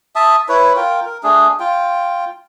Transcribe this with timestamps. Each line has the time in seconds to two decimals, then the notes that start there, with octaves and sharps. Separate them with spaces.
0.16 E5 A5 D#6
0.49 E4 B4 C#5
0.77 F4 A#4 G5
1.06 A#4
1.23 A3 D4 G#4
1.60 F4 G5